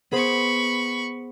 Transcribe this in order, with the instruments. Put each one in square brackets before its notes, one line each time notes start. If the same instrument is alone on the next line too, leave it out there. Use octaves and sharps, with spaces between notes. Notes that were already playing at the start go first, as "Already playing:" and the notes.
[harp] B3 G#4 C5 [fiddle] B5 C#6